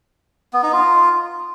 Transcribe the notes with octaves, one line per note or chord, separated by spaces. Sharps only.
B3
D#4
F4